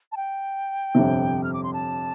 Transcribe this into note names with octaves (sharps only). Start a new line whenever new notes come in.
A5
G5
G1 F2 C3
F6
D6
C6
A5